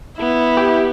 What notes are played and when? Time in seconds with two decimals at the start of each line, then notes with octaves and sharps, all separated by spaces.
0.19 B3 E4
0.57 G4